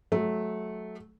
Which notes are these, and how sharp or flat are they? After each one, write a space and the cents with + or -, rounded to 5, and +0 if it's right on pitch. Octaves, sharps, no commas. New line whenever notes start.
F#3 +0 A3 -20